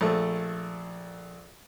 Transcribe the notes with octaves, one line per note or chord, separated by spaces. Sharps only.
A#1 A3